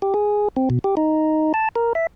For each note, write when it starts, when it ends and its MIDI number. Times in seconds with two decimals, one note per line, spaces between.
0.02 0.14 67
0.14 0.48 68
0.56 0.69 60
0.70 0.79 47
0.84 0.95 67
0.97 1.53 63
1.54 1.69 81
1.76 1.93 70
1.95 2.07 76